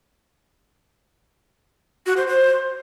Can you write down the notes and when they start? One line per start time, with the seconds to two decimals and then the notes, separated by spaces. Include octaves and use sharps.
2.06 F#4
2.17 C5
2.27 C5